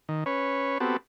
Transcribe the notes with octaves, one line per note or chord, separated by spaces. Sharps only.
D#3
C#4 B4 C#5
B3 C4 F#4 G4 A4